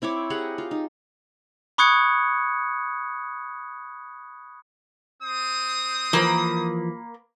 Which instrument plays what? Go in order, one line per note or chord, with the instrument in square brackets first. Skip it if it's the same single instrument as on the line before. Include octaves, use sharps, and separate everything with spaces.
[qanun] C4 E4 C#5 D6
G4 G#4 F#5 A#5
F4
D#4
[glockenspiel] B5 C#6 D#6 F#6 G#6 C#7
[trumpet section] C4 C5 D#6
[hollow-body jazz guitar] E3 F3 [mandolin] A#3 B5